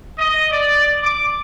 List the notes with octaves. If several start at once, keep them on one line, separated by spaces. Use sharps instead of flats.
D#5
D5
D6